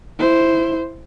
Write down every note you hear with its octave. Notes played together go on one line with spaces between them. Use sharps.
E4 C5